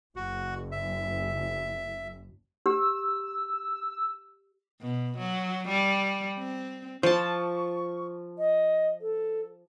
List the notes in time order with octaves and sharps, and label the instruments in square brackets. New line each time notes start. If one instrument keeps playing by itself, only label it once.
[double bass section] F#1 [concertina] F#4
[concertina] E5
[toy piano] G4 [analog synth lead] E6
[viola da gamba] B2
F#3
G3
C4
[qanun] F3 A5 [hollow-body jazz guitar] C5 [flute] C#6
[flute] D#5
A4